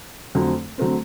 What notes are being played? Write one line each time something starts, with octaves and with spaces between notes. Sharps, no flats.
F2 D3 F#3 A3 C4
D3 F#3 A3 C4